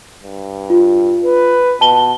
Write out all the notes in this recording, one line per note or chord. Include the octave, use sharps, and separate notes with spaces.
G2
F4
B4
B2 A5 G7